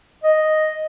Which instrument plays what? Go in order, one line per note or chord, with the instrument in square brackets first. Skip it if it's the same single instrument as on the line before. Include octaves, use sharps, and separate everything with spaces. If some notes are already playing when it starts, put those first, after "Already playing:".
[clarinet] D#5